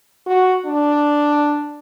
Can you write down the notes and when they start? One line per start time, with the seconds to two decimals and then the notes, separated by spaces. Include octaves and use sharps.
0.27 F#4
0.66 D4